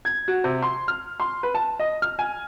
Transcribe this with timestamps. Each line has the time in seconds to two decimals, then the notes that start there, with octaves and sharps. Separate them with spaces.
0.05 G#6
0.28 F#4
0.44 C3
0.63 C6
0.88 F6
1.20 C6
1.43 B4
1.55 A5
1.80 D#5
2.02 F6
2.19 G#5